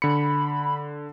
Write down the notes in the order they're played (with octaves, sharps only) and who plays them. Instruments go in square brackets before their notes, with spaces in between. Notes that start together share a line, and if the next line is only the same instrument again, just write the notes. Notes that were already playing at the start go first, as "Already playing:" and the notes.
[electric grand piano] D3 C#7 [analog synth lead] B5